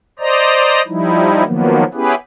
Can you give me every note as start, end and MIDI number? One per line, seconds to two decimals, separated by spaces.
0.19 0.82 72
0.19 0.82 74
0.19 0.82 75
0.19 0.82 82
0.87 1.44 53
0.87 1.44 55
0.87 1.44 63
0.87 1.44 64
1.44 1.84 51
1.44 1.84 53
1.44 1.84 54
1.44 1.84 58
1.44 1.84 59
1.94 2.14 59
1.94 2.14 61
1.94 2.14 64
1.94 2.14 67
1.94 2.14 68
1.94 2.14 71